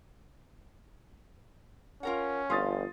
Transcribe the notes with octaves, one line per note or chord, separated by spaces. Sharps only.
C#4 F4 A#4 F#5
G1 F3 F4 C6 D#6 A6